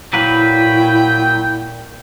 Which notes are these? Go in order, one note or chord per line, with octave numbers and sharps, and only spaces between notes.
A#2 F#3 A#3 E4 B4 G5